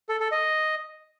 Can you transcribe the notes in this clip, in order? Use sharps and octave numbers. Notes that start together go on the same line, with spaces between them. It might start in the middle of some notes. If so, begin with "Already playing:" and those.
A4
A4
D#5